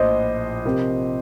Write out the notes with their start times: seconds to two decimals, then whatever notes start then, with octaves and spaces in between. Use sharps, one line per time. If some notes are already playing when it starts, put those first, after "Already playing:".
Already playing: A#1 A2 C5 D#5
0.65 C3 F3 C4 G4 A#4